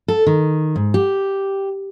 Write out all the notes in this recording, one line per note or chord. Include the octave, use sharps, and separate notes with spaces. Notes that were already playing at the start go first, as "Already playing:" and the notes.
A4
D#3
G#2
G4